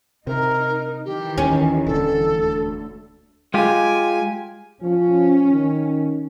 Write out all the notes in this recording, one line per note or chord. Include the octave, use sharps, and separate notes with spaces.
C3 D#4 A#4
D#3 E3 G4
D#2 C#4
D#1 D3 A4
D2
G#3 F4 G4 G#5
F3 C#4
D#3